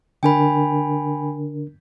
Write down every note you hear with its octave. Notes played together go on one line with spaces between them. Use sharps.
D3 D4 A#4 G5 G#5 B5